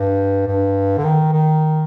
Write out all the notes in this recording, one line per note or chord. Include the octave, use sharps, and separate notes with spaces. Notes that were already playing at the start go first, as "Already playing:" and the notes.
Already playing: G2
G2
D3
D#3
D#3